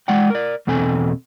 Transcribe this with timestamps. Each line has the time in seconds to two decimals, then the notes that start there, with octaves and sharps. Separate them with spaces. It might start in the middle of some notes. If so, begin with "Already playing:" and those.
0.08 G#3 D5 F#5 G5
0.30 A#4 D5
0.67 E2 B2 C4 A4 G#5